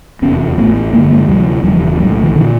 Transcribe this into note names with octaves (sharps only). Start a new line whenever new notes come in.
F1 E2 C3 B3 C#4
A1 A2 A3 B3
A1 G2 D3 G#3 A#3
G#3 A#3
D2 C3 F3 G3
E1 E2 C#3 F3 G3
B1 A2 F#3 G#3
D#3 F3
A#2 D3 E3